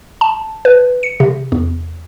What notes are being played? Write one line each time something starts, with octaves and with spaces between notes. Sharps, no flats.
A5
B4
C#7
C3
E2